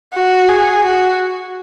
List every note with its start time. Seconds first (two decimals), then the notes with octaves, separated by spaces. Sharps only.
0.14 F#4
0.49 G#4
0.85 F#4